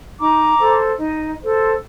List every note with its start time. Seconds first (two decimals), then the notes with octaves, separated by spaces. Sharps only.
0.19 D#4 A#5 D6
0.59 A4 C5
0.99 D#4
1.40 A4 C5